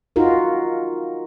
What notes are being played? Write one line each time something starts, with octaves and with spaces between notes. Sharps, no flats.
D#4 F4 F#4 A#4